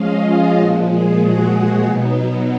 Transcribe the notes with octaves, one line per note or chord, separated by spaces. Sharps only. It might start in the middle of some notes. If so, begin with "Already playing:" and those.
Already playing: F3 G#3 C#4 D#5 F5
F4
A#2 F3 G#3 F#4
G#4
F#4
B2 F#3 B3 D#4